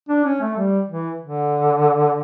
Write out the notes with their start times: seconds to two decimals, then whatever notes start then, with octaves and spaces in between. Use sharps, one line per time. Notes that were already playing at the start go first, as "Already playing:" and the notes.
0.09 D4
0.25 C#4
0.41 A3
0.57 G3
0.89 E3
1.22 D3